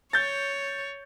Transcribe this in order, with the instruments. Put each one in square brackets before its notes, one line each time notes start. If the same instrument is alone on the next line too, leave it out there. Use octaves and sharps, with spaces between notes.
[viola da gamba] C#5 [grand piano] G6 A6